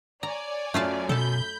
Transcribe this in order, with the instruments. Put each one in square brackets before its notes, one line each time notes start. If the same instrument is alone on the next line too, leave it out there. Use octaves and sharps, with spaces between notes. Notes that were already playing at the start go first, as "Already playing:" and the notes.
[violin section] C#5 D5 G#5 [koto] A#5
[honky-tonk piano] F#2 C#4 [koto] A3 F4 A5
[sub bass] B2 [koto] A4 A5 [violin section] B5 G6